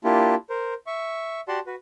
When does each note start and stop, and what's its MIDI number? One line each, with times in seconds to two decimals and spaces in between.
0.04 0.35 58
0.04 0.35 62
0.04 0.35 64
0.04 0.35 65
0.04 0.35 67
0.50 0.74 70
0.50 0.74 72
0.87 1.41 76
0.87 1.41 85
1.48 1.59 66
1.48 1.59 67
1.48 1.59 74
1.48 1.59 78
1.48 1.59 81
1.48 1.59 84
1.66 1.75 66
1.66 1.75 71